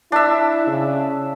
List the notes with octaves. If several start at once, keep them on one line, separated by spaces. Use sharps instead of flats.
D4 E4 E5
C#3